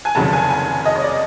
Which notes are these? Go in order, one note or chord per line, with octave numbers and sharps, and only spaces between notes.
G#5
F1 D#2 C#3 F#3 A5
G#5
G#5
D#5
C#5
D5